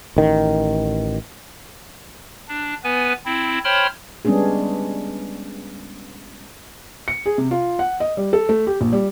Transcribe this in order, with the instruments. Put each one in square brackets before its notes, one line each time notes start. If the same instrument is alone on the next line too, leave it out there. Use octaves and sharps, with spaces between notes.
[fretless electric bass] A1 D#3
[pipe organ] D4
B3 B4 G#5
C4 E4
C5 C#5 G5 B5 C6 F6
[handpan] G3 G#3 B3 C#4 D4 G#4
[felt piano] C#7
G#4
C3
F4
F#5
D#5
G3
A4
A3
G4
A#1
G3